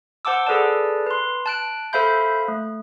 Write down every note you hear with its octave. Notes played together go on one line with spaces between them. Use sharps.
C5 F#5 A5 D6 E6
G#4 A4 B4 D5 A5
B4 C6
A5 F#6 D7
A4 C5 E5 F5 B5 G6
A3